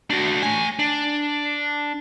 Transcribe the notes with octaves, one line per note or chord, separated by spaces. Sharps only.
D4 F#4
A3 G#5
D4